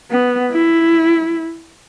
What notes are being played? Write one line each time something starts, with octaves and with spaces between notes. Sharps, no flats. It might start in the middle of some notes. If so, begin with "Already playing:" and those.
B3
E4